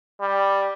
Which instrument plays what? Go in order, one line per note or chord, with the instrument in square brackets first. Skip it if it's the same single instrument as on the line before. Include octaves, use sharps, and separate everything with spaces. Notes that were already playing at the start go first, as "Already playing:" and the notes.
[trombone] G3